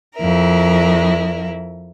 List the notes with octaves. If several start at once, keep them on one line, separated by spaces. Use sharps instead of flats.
F2 E4 A#4